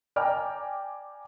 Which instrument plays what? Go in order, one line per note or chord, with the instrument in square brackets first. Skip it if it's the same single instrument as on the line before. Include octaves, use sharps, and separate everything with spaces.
[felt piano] D5 G5 G#5 A#5 D6 F6